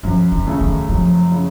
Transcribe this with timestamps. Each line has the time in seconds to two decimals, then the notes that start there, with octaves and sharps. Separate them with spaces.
0.03 F#2 F3
0.32 D#3
0.47 C#3 A3
0.60 D#3
0.89 F#2 F3
1.32 C#3